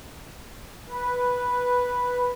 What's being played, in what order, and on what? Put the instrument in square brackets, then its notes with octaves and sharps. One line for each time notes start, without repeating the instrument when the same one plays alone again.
[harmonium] B4